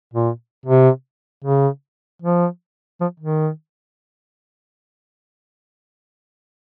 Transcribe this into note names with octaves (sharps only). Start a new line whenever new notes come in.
A#2
C3
C#3
F3
F3
D#3